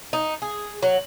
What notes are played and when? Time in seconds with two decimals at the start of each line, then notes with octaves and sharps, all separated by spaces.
0.13 D#4
0.42 G#4
0.83 F#3